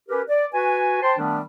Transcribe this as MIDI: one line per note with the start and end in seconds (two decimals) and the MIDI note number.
0.09 0.22 61
0.09 0.22 67
0.09 0.22 70
0.09 0.22 71
0.29 0.46 74
0.53 1.00 66
0.53 1.00 71
0.53 1.00 80
1.02 1.14 72
1.02 1.14 79
1.02 1.14 81
1.02 1.14 84
1.18 1.40 51
1.18 1.40 55
1.18 1.40 57
1.18 1.40 59
1.18 1.40 62